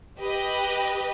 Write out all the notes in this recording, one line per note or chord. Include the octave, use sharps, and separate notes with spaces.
G4 B4 D#5